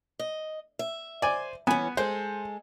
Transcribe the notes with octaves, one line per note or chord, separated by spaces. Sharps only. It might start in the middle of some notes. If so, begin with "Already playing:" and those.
D#5
E5
C5 D5 G#5
E3 B3 C#4 G#5
G#3 G#4 A4 C5